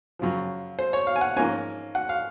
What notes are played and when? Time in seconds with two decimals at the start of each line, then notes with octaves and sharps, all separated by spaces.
0.19 F#2 C#3 F3
0.79 C5
0.93 C#5
1.07 F5
1.16 G#5
1.21 F#5
1.36 G#2 F3 A#3 C#4 G#5
1.95 F#5
2.09 F5